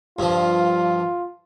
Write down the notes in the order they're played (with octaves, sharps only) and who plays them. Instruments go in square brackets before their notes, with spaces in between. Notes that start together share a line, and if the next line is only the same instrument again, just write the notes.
[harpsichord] G2 F3 [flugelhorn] F4